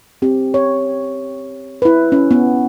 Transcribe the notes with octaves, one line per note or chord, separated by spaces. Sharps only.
C4 G4
C#5
E4 B4
C#4
B3